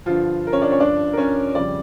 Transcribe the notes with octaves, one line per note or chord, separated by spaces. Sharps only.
G2 D3 F3 F4
A#4
C#4 C#5
D4 D5
C#4 C#5
G2 F3 D4 D5
A#4
C#4 C#5
F2 C#3 G3 D5